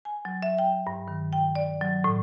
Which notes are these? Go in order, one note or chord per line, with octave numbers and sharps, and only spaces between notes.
G#5
F#3
E5
G5
G2
D#3
G5
D5
F#3
A2